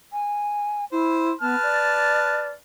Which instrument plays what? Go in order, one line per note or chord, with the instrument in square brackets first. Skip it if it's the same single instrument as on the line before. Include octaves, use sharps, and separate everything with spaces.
[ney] G#5
[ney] E4 [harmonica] C5
[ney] B3 [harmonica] B4 A5 F6
[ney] D5